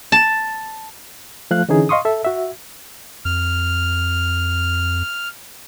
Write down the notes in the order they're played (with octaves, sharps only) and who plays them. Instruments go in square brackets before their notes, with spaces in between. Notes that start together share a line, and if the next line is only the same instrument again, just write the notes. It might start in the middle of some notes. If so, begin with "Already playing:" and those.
[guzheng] A5
[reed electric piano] F3 A3 F5 F#6
D3 E3 C#4 D#4 G#4
D#5 F5 C6 C#6 D#6
A4 E5
F#4 E5
[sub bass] F2 [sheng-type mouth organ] F6